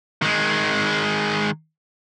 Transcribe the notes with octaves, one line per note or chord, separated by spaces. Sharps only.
D#3 G#3